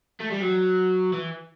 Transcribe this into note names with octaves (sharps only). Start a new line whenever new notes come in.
A3
G3
F#3
E3